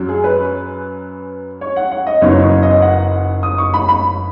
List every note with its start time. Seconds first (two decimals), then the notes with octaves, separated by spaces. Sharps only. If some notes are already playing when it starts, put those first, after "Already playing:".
Already playing: F#2 F#3 C#4
0.09 G#4
0.24 B4
1.61 C#5
1.76 F#5
1.91 F#5
2.07 D#5
2.21 F#1 F#2 F#3 B3 D#4 C#5
2.41 C#5
2.63 D#5
2.82 F#5
3.43 D#6
3.58 C#6
3.74 B5
3.89 B5